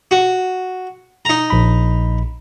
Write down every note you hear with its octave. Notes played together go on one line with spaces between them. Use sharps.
F#4
D#4 A#5
A#1 B5